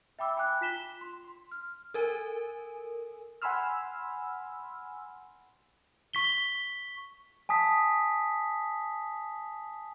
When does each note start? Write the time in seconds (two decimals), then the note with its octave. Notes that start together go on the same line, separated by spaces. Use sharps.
0.19 E5 G5 B5 D6 E6
0.37 G5 G#5 B5 D6 F#6
0.61 F4 B6 E7 G7
1.01 C6
1.24 C6
1.51 F6
1.94 A4 A#4 G#5
3.42 F#5 G#5 B5 C6 E6 F6
6.13 C#6 B6 G7
7.49 G#5 A5 D#6 B6